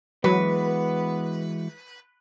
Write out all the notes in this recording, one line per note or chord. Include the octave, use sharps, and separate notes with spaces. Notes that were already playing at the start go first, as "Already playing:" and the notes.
E3 F#3 G#3 B3 F#4 B4